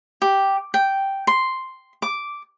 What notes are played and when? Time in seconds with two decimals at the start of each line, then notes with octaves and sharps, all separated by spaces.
0.22 G4
0.74 G5
1.27 C6
2.02 D6